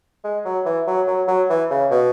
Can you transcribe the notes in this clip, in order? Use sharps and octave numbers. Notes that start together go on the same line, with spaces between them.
G#3
F#3
E3
F#3
F#3
F#3
E3
C#3
B2